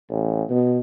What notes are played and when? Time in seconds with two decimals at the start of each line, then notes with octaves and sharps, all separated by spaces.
0.10 A1
0.50 B2